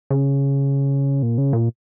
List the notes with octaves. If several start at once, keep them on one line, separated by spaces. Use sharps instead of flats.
C#3
A#2
C#3
A#2